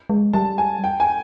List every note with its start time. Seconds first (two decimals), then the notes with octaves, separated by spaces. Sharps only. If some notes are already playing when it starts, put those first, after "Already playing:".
0.10 G#3
0.33 G3 A5
0.58 G#5
0.84 G5
1.00 G#5